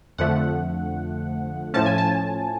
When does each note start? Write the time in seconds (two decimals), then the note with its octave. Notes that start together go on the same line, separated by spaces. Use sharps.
0.18 F2 D3 F3 A3 F#5
1.74 A2 F3 A3 C#4 A5
1.86 G#5
1.98 A5